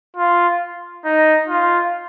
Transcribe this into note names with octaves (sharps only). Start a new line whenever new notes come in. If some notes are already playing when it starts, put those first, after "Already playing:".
F4
D#4
F4